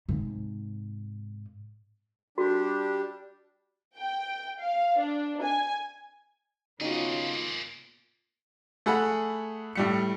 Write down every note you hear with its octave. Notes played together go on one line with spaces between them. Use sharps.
G#2 C3
G3 D4 F#4 G4
G5
F5
D4
G#5
C#3 A#3 B3 D#4 F4 F#4 G#4
A3 G#4 F#5 B5
A2 G3 C#7